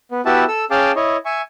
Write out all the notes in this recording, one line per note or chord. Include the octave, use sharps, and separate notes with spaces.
B3
B3 E4 F#4 G4 E5 A5
A4 E6
C#4 G#4 F5 G5 A5 D6
E4 C#5 D#5
E5 G#5 C#6